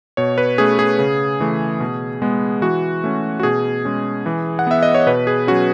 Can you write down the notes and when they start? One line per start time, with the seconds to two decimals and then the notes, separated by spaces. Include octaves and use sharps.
0.17 B2 C#5
0.38 B4
0.58 A3 C#4 G#4
0.79 G#4
0.99 C#3
1.40 E3 A3
1.80 B2
2.22 G#3 B3
2.62 E3 F#4
3.04 A3 C#4
3.40 F#4
3.43 B2 G#4
3.85 G#3 C#4
4.26 E3
4.59 F#5
4.67 B3 E5
4.83 D#5
4.94 C#5
5.07 B2 B4
5.27 G#4
5.47 F#3 C#4 F#4